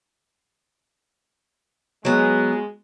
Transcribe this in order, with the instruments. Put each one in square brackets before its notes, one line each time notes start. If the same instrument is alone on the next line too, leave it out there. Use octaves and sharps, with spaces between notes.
[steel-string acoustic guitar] F#3 B3 [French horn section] G#3